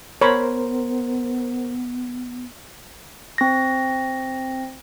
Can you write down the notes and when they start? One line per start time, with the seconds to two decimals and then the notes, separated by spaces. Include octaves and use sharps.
0.22 B3 A#4 C5 C#5 B5
3.38 C4 A#6